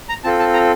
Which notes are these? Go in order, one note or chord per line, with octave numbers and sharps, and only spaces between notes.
A#5
C4 F4 A4 A5
A5
A#5